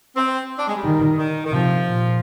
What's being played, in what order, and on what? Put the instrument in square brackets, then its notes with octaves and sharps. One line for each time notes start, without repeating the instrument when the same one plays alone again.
[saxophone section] C4
D4
G#3
G3
[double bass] D#3
[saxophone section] D#3
D#3
[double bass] C3 [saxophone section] F3
[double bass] A#2